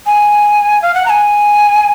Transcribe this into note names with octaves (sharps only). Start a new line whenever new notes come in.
G#5
F5
F#5
A#5
G#5